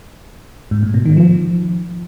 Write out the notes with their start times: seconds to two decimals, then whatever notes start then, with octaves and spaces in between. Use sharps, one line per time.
0.71 G#2
0.83 A2
0.94 B2
1.06 D#3
1.17 F3